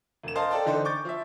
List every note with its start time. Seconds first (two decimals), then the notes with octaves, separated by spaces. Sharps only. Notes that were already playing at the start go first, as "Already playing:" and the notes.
0.23 E1 E7
0.35 A#4 C5 D#5 F5 A5 C6
0.50 A4 C5 D5 G5 A5
0.65 D3 E3 D4 D#4 A4 C5
0.85 C#6 D6 G6 A6
1.05 F3 E5